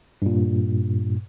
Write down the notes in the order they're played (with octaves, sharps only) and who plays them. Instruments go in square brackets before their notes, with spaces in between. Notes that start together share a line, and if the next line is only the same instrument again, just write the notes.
[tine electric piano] G2 A#2